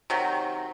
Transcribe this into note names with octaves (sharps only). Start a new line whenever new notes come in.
C3 D#3 F#3